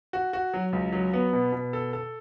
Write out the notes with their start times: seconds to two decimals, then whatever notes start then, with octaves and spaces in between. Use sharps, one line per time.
0.13 F#4
0.33 F#4
0.54 F#3
0.73 C#2
0.93 F#3
1.13 B3
1.33 B2
1.52 B2
1.73 A4
1.93 A4